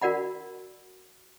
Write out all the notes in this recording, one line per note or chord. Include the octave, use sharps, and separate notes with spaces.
F#4 A#4 D5 F#5 B5